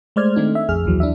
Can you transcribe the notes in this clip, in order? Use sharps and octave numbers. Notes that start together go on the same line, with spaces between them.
G#3 A3 C5 D5 F6 G#6
D#3 A3 C4 D4 D#4
E5
A#1 F2 G#4 F6
A#1 D#2 E3 F#3
D4 E4 E5